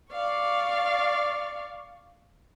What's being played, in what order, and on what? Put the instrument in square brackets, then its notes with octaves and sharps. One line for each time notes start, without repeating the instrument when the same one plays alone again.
[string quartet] D5 F5 C#6